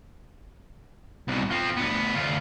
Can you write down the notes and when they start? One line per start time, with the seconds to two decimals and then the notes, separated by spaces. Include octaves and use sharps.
1.28 C2 B2
1.51 F3 C4
1.77 D2 B3
2.15 D2 F4